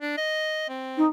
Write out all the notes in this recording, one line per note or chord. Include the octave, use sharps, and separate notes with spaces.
D4
D#5
C4
D#4